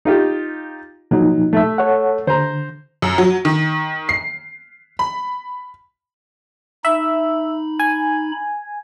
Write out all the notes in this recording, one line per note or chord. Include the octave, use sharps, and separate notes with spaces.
D#4 F4 G4
A#2 F3 F#3 D#4
A3 E5
A4 C#5 F#5
D3 C5 A#5
F#2
F#3
D#3
C7
B5
D#4 E5 B5
G#5